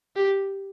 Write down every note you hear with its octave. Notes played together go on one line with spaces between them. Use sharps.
G4